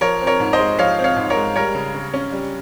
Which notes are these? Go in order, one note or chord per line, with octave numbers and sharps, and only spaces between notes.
F3 A#4 C#5
C4
A#4 C#5
G#2
C5 D#5
G#3
F3 C#5 F5
C4
C#5 F5
G#2
A#4 C#5
G#3
G3 A#4 C#5
C#3
C#3
C#4
G3